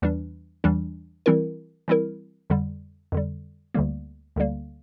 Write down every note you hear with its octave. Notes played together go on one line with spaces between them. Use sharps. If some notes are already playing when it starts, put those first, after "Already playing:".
E2 E3 G3 D4
E2 E3 G3 D4
E3 G3 C4 E4 A#4
E3 G3 C4 E4 A#4
F2 D3 G3
F2 D3 G3
D2 D3 G3 A#3
D2 D3 G3 A#3